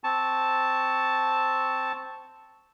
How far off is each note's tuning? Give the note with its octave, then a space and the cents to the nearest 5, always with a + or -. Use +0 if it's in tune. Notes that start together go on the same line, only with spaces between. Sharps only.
C4 +0 A5 +0 C#6 +0